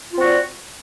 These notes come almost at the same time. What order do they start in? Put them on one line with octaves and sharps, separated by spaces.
F4 C4 F#4 D5